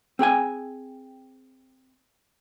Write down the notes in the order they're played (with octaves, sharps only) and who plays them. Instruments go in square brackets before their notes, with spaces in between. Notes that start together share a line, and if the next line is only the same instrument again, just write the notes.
[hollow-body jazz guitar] C4 G#4 G5 G#5